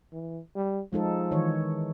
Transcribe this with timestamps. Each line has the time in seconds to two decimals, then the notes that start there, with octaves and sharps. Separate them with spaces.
0.12 E3
0.56 G3
0.93 F3 G#3 D#4 A4
1.31 D#3 E3 C#5